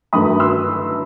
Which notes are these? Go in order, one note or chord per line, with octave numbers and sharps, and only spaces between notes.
G2 D#3 F#3 A3 B5 D#6
C6 E6